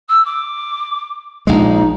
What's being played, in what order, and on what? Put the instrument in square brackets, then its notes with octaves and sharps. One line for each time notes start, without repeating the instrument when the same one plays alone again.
[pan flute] E6
D6
[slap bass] A#1 G#3 [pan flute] D#4